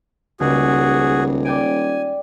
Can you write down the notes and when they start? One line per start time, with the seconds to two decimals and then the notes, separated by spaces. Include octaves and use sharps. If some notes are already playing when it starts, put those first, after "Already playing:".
0.40 D#1 C#2 F#4 G#4
1.45 D5 G5 G#5 D7